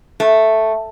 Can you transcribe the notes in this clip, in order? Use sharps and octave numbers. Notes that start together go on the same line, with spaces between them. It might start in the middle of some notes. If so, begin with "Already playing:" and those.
A3